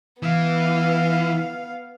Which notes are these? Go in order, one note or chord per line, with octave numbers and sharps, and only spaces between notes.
E3 B3 F5